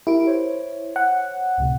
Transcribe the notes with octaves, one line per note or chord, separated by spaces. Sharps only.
E4 G4 A#4 D7
C5 C#5
F#5
C#2 A2 C3